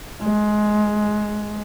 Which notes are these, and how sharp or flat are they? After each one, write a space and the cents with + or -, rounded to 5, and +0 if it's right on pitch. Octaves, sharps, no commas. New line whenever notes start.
G#3 +15